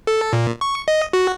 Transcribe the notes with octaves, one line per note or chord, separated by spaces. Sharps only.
A4
A#2
C#6
D#5
F#4